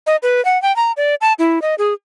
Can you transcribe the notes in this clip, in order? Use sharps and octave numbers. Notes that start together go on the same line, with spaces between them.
D#5
B4
F#5
G5
A#5
D5
A5
E4
D#5
G#4